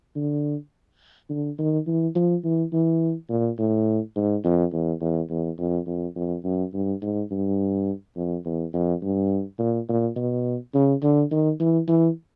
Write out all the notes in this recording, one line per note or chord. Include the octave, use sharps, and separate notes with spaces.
D3
D3
D#3
E3
F3
E3
E3
A#2
A2
G#2
F2
E2
E2
E2
F2
F2
F2
F#2
G2
G#2
G2
F2
E2
F2
G2
A#2
A#2
B2
C#3
D3
D#3
E3
E3